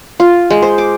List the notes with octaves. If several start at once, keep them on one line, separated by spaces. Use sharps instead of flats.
F4
G#3
C5
D6